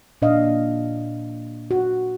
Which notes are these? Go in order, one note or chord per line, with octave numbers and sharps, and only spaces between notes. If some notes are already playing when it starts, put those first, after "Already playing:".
A#2 D4 D#5 F5
F#4